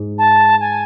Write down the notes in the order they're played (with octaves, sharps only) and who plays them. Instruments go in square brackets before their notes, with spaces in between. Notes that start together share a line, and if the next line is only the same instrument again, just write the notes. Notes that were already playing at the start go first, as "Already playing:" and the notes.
Already playing: [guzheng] G#2
[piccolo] A5
G#5